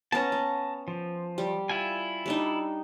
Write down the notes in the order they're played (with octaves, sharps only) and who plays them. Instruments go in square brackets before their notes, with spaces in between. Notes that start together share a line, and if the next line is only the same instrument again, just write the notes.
[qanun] B3 C#4 [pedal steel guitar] A5 A#5
[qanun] B3
[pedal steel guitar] F3
[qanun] G3
[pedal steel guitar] E4 F4 G#5
[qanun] G3 D4 D#4